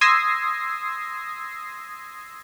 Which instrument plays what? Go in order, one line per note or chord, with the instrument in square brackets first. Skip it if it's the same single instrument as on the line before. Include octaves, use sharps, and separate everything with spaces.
[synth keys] C6 D#6 E6 G#6 A#6 C7